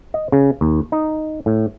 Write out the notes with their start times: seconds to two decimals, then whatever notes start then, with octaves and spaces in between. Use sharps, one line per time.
0.14 D#5
0.32 C#3
0.61 D#2
0.92 D#4
1.46 A2